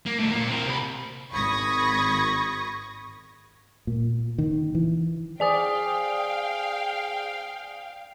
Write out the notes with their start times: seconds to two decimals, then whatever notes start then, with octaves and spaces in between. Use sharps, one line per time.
0.06 A#3
0.19 D#3 A3
0.31 A#2 A#3
0.47 C4 A#4
0.66 C3 B5
1.32 G#1 B5 C#6 D#6 G#6 A#6
3.87 A#2
4.38 D#3
4.75 E3
5.40 G#4 C5 D5 F5 G5 G#5 D#6